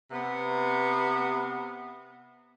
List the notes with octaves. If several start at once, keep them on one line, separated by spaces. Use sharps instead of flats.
C3 B3